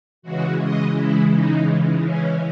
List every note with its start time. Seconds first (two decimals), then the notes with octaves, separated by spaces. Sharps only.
0.22 C#3 E3 G#3 F#4
0.59 D#5
0.94 E4
1.31 D#4
2.02 C#4